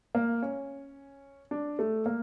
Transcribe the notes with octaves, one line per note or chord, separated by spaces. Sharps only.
A#3
C#4
D4
A3
A#3